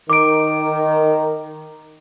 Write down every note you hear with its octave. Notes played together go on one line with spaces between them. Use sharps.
D#3 D6 D7